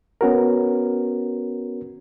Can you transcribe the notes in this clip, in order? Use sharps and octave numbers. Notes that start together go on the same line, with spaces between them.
B3 C#4 F#4 A#4